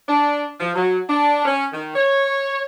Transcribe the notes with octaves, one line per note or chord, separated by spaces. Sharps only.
D4
F3
F#3
D4
C#4
D#3
C#5